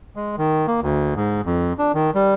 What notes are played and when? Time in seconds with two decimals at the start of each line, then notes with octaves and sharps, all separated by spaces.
0.16 G#3
0.38 D#3
0.68 A#3
0.82 D2
1.16 G#2
1.46 F2
1.79 D4
1.94 D#3
2.15 G3